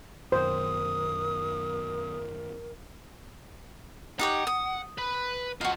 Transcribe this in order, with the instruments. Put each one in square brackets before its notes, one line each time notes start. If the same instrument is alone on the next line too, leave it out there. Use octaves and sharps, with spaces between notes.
[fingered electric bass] F#2 B2 D#3 [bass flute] A#4 [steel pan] C5 [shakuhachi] D#6
[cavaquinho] D#4 G4 C#5 [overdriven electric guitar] F#5
[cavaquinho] D#6
[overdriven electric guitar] B4 B5
[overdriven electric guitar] F4 D#5 [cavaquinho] F#4 F5